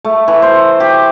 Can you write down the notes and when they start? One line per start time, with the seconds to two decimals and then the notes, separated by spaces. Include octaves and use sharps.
0.05 A3
0.28 E3
0.42 C5
0.80 G4